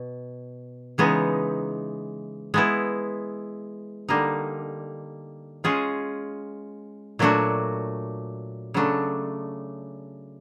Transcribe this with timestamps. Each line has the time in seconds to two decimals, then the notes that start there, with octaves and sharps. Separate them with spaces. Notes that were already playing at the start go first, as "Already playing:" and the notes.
Already playing: B2
0.98 C#3 E3 G#3 B3 D#4
2.54 G#3 B3 E4
4.09 D3 G3 A#3 D#4
5.64 G#3 C#4 F4 G#4
7.19 A#2 F#3 A3 D4 F#4
8.74 C#3 F#3 A3 D4